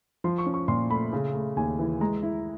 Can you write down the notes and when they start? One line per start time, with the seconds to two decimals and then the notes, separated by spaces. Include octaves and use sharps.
0.24 F3 C6
0.38 C#6
0.46 C#4
0.54 C#6
0.68 A#2 C6
0.90 A3 B5
1.13 C#3
1.34 A3
1.56 D#2 G#5
1.79 E3
2.01 G#3 A#5
2.23 E4